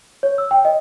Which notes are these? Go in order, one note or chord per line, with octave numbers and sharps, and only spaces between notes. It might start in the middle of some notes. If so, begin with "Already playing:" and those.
C#5
E6
G5
D#5